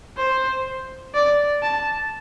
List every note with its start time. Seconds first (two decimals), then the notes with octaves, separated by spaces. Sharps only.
0.17 C5
1.15 D5
1.63 A5